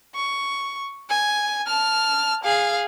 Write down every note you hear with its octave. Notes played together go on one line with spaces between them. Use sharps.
C#6
G#5
A5 F6
G#4 F5